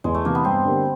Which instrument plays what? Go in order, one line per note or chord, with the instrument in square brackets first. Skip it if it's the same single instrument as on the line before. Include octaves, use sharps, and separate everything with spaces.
[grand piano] E2 [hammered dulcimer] G#3
[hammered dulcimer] A3
[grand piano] C3 E3 [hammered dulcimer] A#3
[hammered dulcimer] B3
[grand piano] G2 [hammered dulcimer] C4
[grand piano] D3 G3 A#3